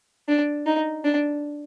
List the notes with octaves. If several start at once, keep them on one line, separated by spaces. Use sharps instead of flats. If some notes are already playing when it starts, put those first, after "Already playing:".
D4
D#4
D4